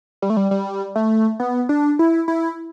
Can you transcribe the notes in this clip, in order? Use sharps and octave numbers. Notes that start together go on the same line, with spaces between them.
G3
A3
G3
G3
A3
B3
D4
E4
E4